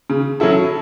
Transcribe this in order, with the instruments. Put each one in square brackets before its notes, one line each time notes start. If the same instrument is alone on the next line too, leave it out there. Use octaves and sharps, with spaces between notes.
[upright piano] C#3
F#3 C#4 E4 A4